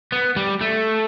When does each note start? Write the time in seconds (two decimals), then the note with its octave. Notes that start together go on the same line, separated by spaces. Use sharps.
0.12 B3
0.36 G3
0.61 A3